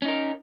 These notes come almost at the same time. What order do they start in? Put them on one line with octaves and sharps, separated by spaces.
C#4 D#4 A#4